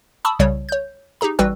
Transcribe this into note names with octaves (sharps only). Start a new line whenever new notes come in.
A5 B5 C#6 D#6 E6
C2 C#3 G3 C#5
C#5 G6
D#4 G4 G#4 A#5
A1 G3 F#4 B4 G5 E6